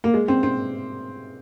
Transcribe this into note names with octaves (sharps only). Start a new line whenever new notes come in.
A#3
G#3
C4
C4